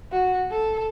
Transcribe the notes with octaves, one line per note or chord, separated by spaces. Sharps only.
F#4
A4